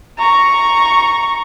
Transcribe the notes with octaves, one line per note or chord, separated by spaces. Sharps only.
A#5 C#6